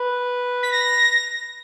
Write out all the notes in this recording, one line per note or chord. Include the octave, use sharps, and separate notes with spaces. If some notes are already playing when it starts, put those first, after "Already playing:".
Already playing: B4
B6
A#6